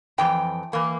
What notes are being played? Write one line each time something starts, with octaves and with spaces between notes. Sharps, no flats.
F2 E3 G5
E3 A#3